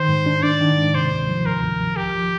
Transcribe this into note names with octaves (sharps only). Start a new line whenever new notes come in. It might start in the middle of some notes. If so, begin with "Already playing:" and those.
Already playing: D#3 C5
G#2
D4
D4 D5
D#3
G#2
C3 C5
D2
F3
D2 A#4
D2
F3
C2 G4
F3